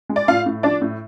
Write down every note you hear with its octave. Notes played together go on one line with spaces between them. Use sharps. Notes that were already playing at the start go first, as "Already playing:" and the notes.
G#3
D5
A2 F4 F5
A2
F3 D4 D5
A2